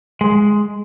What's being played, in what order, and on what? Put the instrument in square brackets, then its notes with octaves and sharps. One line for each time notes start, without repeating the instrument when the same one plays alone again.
[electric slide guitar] G#3